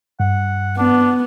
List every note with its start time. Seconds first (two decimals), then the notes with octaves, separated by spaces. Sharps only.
0.20 G2 F#5
0.78 B3 D4